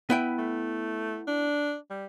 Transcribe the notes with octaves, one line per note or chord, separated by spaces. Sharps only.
B3 E4 G5
A3
D4
G3